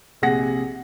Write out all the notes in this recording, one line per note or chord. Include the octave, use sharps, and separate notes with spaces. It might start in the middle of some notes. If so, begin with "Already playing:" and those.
A#1 C3 G#4 F#5 A#6